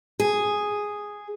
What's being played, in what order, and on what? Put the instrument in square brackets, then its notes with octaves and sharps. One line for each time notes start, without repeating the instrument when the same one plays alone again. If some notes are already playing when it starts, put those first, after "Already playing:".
[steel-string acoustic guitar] G#4